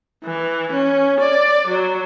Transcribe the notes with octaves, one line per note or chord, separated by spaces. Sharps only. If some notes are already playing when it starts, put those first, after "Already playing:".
E3
C#4
D5
F#3